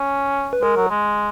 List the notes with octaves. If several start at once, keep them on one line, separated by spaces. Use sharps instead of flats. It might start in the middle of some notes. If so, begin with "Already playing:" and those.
Already playing: C#4
B4
G#3 A#4
F#3
G#3